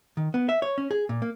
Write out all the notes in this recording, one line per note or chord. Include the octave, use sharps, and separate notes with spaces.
D#3
B3
E5
C#5
C#4
G#4
A#2
A#3